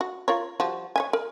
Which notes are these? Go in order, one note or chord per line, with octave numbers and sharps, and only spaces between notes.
F#4
F4 A#4 C#5
F3 G3 F#4
C#5 E5 G#5
A#4